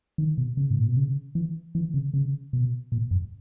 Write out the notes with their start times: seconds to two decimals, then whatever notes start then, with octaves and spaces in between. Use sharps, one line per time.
0.18 D#3
0.38 B2
0.57 C#3
0.70 G#2
0.79 A#2
0.88 B2
0.96 C#3
1.35 E3
1.75 E3
1.94 C#3
2.14 C#3
2.53 B2
2.92 A#2
3.11 F#2